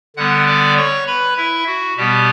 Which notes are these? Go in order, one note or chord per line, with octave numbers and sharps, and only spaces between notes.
D3 G3 B3 F#5 F#6
D5 D6
C#5 C#6
B4 B5
E4 E5
F#4
B2 G3 B3 G4